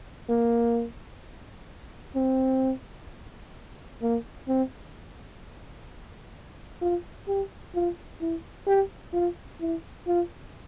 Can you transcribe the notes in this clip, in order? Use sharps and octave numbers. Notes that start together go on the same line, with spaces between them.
A#3
C4
A#3
C4
F4
G4
F4
E4
G4
F4
E4
F4